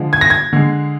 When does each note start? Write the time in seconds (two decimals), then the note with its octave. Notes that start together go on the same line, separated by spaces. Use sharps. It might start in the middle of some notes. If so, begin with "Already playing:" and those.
Already playing: D3 F3 G#3
0.13 G#6
0.21 A#6
0.30 G#6
0.53 D3 G#3